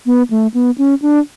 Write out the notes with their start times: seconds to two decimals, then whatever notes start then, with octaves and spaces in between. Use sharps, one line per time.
0.06 B3
0.30 A3
0.54 B3
0.78 C#4
1.02 D4